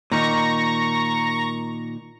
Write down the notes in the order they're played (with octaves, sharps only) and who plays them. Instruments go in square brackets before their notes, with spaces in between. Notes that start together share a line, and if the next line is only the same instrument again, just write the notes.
[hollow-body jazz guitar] A#2 D#3 [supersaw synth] A#5 C#6 A#6